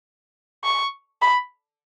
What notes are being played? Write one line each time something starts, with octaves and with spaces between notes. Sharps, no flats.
C#6
B5